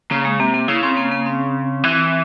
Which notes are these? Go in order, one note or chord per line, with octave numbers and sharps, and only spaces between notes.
C#3 A#3
G#3
C3 A#3
A#3
C#3 E4
C4
A#3
A#3
C4
E3